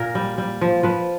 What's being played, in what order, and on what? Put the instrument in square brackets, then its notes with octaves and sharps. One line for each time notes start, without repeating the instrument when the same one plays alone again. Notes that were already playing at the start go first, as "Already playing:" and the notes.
Already playing: [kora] A#2 A#4
G3
G3
F3
F3 B4